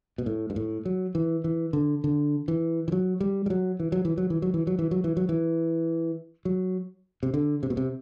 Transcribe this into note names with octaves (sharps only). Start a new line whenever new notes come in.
B2
A2
G2
A2
F#3
E3
E3
D3
D3
E3
E3
F#3
G3
G3
F#3
E3
F#3
E3
F#3
E3
F#3
E3
F#3
E3
F#3
E3
F#3
E3
F#3
C3
D3
C3
B2
C3